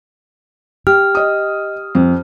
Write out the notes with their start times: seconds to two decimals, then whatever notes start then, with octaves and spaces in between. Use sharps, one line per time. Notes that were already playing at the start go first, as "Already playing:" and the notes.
0.87 G4 F6
1.15 D#5 D#6
1.95 F2